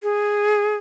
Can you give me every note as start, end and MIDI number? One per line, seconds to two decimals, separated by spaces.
0.03 0.76 68